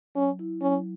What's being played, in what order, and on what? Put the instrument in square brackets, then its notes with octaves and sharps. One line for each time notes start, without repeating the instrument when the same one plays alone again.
[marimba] F#3 [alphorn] C#4
[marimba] E4
[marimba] F#3 [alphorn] C#4